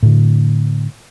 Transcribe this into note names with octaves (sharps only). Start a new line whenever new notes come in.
A2 D3